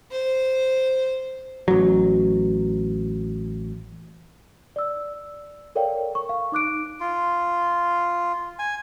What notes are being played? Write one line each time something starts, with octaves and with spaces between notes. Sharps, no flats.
C5
A1 F#3
D5 E6
A4 A#4 C#5 D5 F5 G5
C#6
F5
D#4 D6 F#6 D7
F4
G#5